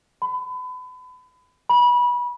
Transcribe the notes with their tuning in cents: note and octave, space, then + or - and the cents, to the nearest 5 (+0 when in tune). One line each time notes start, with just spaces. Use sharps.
B5 +35
B5 -25